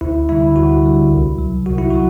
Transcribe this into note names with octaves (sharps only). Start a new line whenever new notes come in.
D2 E4
D3 G3 E4
D2 F#4
D3 G3
C2
B2 F#3
C2 F#4
E4
F#3 F#4